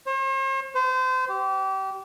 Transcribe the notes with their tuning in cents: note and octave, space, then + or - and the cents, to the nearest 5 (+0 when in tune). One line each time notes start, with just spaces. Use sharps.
C5 +45
C5 -30
G4 -30